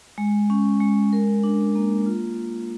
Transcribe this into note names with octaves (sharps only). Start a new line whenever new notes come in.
G#3
C#4
G#3
A#4
D4
A#3
F4